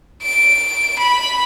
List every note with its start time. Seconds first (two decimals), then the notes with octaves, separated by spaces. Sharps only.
0.23 D7
0.99 B5